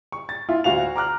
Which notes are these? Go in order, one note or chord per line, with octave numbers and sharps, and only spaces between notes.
C#6
A6
E4 F4
D2 F#4 F5 F7
A#5 D6 F6 F#6